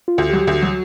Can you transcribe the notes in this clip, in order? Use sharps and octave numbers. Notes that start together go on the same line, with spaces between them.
F4
D2 F#4
G4
F#3
G4
D2 F#4
F#3